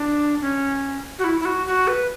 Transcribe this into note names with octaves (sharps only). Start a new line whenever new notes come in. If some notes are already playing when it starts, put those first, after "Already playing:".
Already playing: D4
C#4
F#4
E4
E4
F#4
F#4
B4